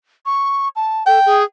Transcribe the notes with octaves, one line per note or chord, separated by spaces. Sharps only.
C#6
A5
A4 G5
G#4